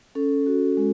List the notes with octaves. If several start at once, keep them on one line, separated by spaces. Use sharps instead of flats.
C#4 A4
F#4
G#3